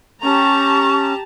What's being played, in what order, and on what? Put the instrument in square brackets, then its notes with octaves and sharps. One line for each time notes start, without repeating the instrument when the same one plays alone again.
[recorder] C#4 [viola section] G4 A5 A#5 [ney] C#6